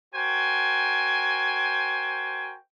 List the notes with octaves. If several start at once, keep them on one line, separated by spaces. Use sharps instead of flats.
F#4 A#4 C5 G5 G#5